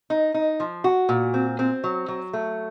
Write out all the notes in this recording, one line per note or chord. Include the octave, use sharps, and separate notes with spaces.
D#4
D#4
F3
F#4
A#2
C4
C4
F#3
F#3
A3